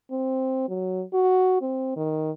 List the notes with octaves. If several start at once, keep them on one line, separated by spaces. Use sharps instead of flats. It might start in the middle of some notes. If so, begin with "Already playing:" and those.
C4
F#3
F#4
C4
D#3